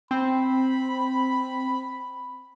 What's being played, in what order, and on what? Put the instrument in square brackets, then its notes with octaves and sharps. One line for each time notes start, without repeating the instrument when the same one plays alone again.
[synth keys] C4 [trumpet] B5